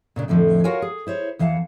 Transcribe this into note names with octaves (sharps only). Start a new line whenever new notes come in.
A#2 C#3 D4
F2 A2 D3 F3
F4 F#4 A#4 C#5 F5 G#5
G#4
E4 C5 C#5
E2 E3 F5 F#5 A5